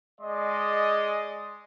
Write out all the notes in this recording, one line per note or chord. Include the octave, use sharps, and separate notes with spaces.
G#3 D5 D#5 C6